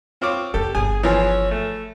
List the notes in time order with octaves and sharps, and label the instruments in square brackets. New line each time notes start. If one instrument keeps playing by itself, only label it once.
[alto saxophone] C4 [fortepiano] F4 C#5 D6
[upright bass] F1 F4 [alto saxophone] G4 [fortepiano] A4
[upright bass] G1 [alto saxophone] G#4 [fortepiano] G#5
[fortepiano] E3 F3 G#4 [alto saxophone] C#5
[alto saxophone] A3